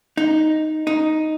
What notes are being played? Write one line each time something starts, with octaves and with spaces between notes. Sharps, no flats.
D#4
D#4